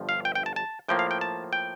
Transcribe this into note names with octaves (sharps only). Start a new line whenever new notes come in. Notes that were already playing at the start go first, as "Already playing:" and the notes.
Already playing: G1 G2 F3
F5
G5
G5
A5
A5
A2 F3 A#3 G5
F5
G5
A5
G5